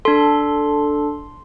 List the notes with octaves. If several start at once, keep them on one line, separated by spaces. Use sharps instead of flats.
D4 A4 C6